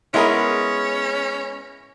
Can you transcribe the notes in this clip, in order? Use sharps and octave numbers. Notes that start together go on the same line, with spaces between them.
G#3 B3 C#4 E4 G#4 A#4